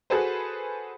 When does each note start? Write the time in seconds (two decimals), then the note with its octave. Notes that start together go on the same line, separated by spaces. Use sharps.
0.10 F#4 G#4 A4 B4 C5